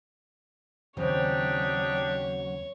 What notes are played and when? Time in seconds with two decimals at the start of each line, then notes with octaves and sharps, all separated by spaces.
0.97 D#2 C#3 F#3 C4 D4 D#4 G4 C#5